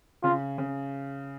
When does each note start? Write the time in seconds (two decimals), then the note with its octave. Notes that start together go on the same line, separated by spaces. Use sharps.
0.23 C#3 F4
0.58 C#3